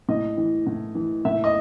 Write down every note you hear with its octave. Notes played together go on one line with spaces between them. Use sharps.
A2 D#5
E3
A2
E3
A2 E5
D#5